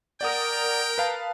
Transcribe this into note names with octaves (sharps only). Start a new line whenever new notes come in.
A#4 D5 F#5 G5 D#6
B4 F5 A5